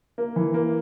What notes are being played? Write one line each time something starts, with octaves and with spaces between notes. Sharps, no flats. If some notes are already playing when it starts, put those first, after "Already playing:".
A#3
E3
A#3